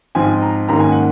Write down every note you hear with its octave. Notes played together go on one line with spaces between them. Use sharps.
G#2 F3 C4 G#5
A#5
G#2 D#3 A#3 C#4 A#5
G#5
F#5